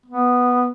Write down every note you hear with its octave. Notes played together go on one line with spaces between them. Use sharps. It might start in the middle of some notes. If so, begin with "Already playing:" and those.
B3